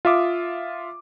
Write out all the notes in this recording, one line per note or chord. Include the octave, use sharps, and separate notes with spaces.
F4 E5 D6 D#6